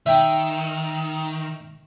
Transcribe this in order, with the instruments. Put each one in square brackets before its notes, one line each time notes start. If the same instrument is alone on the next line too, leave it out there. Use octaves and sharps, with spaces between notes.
[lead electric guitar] D#3 [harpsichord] E5 G5